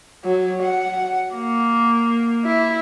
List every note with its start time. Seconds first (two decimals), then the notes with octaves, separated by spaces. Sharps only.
0.25 F#3
0.62 F#5
1.35 A#3
2.45 E4